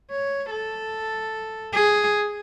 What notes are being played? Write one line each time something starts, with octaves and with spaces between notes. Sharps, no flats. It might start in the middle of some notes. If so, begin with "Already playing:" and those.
C#5
A4
G#4